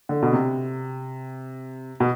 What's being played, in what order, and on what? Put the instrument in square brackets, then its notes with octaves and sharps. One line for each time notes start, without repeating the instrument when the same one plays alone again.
[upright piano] D3
B2
C3
B2